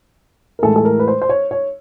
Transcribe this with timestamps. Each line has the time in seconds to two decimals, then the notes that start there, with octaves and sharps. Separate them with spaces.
0.59 A#4
0.63 A2 E3 G#3 A4
0.76 A4
0.85 A#4
0.99 B4
1.08 C5
1.22 C5
1.29 C#5
1.51 C#5